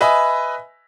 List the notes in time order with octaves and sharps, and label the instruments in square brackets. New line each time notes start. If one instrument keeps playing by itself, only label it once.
[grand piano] B4 D#5 E5 G#5 B5